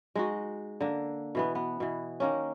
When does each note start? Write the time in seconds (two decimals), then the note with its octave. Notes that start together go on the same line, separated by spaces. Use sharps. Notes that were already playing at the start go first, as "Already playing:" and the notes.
0.15 G#3 D#4 F#4
0.80 D3 A#3
1.35 B2 E3 B3
1.55 B3
1.80 B2 E3
2.20 D#3 A#3 C#4